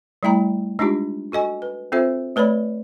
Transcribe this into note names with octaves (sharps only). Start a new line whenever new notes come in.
G3 A3 E4 G5 A#5 B5
G#3 D4 D#4 F4 G4
F#4 A4 D#5 G#5
B4
C4 F4 A4 C5 E5
A3 B4 C#5 D5 B5